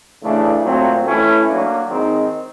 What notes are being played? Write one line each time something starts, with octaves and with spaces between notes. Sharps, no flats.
C#3 E3 A3 D4
A#2 F#3 A3 C4
E3 A3 C#4 E4
F#3 A#3 D4
D#3 G#3 C4 D#4